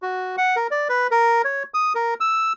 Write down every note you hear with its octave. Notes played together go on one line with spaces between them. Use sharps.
F#4
F#5
A#4
D5
B4
A#4
C#5
D#6
A#4
E6